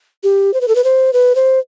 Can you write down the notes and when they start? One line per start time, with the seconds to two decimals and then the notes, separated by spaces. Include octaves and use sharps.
0.23 G4
0.54 C5
0.61 B4
0.68 A4
0.75 B4
0.84 C5
1.13 B4
1.35 C5